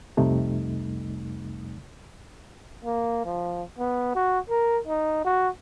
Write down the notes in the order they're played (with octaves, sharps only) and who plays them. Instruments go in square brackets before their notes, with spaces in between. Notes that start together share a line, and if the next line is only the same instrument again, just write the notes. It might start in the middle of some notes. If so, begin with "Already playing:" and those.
[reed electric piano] C2 F2 C3 G3 A3 D#4
[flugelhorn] A#3
F3
B3
F#4
A#4
D#4
F#4